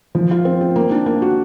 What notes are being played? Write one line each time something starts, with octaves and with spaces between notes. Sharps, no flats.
F3
F4
C4
C4
A#3
D4
A#3
F#4